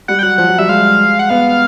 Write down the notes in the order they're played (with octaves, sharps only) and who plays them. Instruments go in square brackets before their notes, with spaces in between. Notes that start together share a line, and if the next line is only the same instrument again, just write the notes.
[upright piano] G3 [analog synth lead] F#5
[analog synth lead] G5
[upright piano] F#3 [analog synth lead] F#5
[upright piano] F3 [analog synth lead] F#5
[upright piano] F#3
[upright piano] G3 [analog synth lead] E5
[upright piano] G#3 [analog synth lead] F5
[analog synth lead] F#5
[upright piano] B3 [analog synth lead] F5